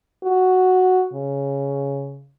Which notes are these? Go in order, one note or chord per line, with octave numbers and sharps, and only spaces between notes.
F#4
C#3